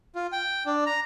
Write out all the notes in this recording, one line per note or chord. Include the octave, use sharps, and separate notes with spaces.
F4
G5
D4
A#5